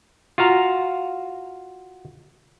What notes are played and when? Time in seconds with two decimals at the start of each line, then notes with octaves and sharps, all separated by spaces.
0.38 F4 F#4 F5 A#5